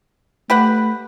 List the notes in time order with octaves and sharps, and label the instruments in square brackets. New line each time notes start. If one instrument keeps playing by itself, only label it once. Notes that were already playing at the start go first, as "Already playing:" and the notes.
[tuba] A3 [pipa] G4 B4 F#5